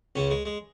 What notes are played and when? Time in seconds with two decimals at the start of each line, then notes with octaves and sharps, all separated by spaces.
0.16 C#2 C#3 C#4
0.30 G#3
0.45 G#3